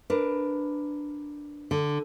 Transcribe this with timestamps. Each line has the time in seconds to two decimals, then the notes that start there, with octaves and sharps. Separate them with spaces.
0.10 D4 A#4 B4
1.71 D3